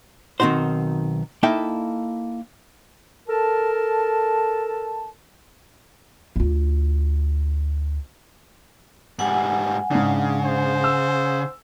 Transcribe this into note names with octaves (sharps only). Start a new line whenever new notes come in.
B1 D#3 C4 D#4 F#4 C5
A#3 D#4 E4 A4 E5 G5
A4 A#4 A5
D2 F4
G#2 G3 F#5 G#5
G#2 C#3 D4
C5
E6